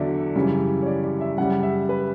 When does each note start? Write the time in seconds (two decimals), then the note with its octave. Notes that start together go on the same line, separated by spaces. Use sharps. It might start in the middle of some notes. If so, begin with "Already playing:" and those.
Already playing: E2 D3 F#3 D5 E5
0.36 F#2 C#3 E3 G3
0.82 C#5
0.86 D5
1.03 D5
1.21 E5
1.37 F#2 C#3 G3 F#5
1.63 E5
1.89 B4